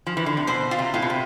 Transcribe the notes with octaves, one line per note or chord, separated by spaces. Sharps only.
F3
E3
D3
C3
B2 C5
F4
C3
A2 F4
B2
C3